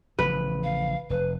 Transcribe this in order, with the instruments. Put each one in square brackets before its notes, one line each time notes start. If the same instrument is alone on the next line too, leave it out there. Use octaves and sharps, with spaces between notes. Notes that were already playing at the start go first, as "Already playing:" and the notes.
[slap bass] A1 C#3 F3 [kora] B4
[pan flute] F5
[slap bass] F1 [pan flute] B4